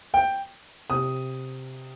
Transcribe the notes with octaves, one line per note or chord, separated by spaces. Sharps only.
G5
C3 D#6